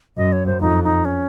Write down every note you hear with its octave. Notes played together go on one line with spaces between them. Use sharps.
F#2 D#5
C#5
C5
F2 D#4
D#4
C#4